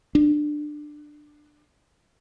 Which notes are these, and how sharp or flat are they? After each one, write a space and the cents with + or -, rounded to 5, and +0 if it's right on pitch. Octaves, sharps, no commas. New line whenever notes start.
D4 +20